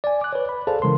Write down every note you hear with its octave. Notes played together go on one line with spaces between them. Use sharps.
D5 G#5
D6 F#6
B4 C#5
B5
G#4 A4 C5 D5 F5 A5
C#3 E3 G#3 A#4 C6